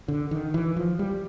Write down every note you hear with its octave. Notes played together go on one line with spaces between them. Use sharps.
D3
D#3
E3
F3
G3